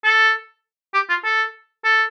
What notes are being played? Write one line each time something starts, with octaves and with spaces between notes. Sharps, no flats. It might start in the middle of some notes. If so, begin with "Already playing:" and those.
A4
G4
F4
A4
A4